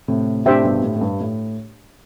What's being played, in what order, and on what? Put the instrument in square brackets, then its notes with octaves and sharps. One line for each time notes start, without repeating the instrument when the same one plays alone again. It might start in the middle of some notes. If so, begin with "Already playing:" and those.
[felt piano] A2 C3
[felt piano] A2 C3 [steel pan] D4 G4 C5 E5 G5
[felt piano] G2 B2
A2
A2
G2
A2